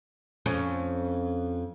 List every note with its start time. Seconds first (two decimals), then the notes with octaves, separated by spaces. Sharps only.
0.46 F2 C#4